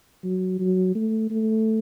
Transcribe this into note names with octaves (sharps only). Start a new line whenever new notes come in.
F#3
F#3
A3
A3